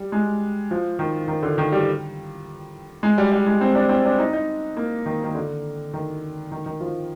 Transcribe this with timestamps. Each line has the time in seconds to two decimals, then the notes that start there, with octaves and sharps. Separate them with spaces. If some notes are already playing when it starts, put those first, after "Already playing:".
Already playing: G3
0.12 G#3
0.71 F3
0.99 D#3
1.28 D#3
1.43 D3
1.58 D#3
1.72 G3
3.03 G#3
3.18 G3
3.32 G3
3.47 G#3
3.61 C4
3.75 D4
3.89 C4
4.05 D4
4.19 D#4
4.33 D#4
4.77 A#3
5.06 D#3
5.24 D#3
5.35 D3
5.94 D#3
6.52 D#3
6.66 D#3
6.80 F3